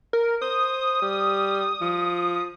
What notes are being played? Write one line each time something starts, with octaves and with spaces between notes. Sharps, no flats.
A#4
C5 D#6
G3
F3